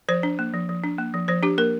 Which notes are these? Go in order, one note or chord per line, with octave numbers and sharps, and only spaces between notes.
F3 C5
D4
A#3
F3
F3
D4
A#3
F3
F3 C5
D4 G4
A#3 A#4